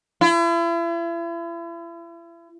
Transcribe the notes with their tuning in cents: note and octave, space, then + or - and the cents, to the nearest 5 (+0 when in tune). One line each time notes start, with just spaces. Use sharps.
E4 +40